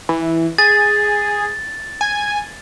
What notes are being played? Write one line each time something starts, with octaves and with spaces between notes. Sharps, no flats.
E3
G#4 A6
G#5